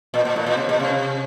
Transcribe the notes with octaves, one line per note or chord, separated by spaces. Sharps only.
A#2
A#2
A2
A#2
C3
A#2
C3